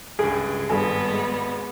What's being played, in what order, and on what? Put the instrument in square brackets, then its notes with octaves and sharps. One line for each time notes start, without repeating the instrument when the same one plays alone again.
[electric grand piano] C#2 G2 [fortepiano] G#4 [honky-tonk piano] D7
[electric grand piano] G#1 [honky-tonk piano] G2 A4 G#5 [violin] B3
[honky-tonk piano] G#3